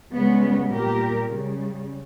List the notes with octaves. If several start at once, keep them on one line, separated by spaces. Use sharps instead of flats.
C#3 G3 G#3 B3
A#2 G3 G4 A#4
C#3 G3